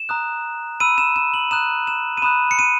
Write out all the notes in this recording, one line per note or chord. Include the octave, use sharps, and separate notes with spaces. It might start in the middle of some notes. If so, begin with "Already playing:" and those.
Already playing: E7
A#5 D#6 F#6
B5 E6 D#7
E7
E7
F#7
A#5 D#6 F#6 E7
E7
D#7
B5 D#6 F#6 E7
C#7
D#7